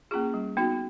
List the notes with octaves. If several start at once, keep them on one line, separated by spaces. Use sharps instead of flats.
A#3 C#4 F4 G#4
G3
B3 D#4 F#4